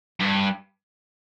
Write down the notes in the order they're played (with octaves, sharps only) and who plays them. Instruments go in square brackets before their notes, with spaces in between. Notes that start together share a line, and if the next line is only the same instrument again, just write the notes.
[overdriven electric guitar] G2